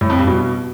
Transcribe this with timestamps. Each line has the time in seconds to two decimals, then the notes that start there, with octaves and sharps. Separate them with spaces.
0.01 A2
0.10 F2
0.18 G2
0.27 B2